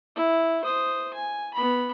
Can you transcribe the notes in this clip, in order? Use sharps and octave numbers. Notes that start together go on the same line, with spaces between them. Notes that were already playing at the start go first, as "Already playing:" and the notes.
E4
C5 D#6
G#5
B3 B5